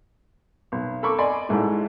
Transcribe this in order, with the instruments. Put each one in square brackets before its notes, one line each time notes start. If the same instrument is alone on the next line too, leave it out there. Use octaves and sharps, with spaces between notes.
[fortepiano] B1
A4 A#4 B5 C#6 D6
D5 D#5 G#5 B5 C6
A1 G#2 G#3 A3 E4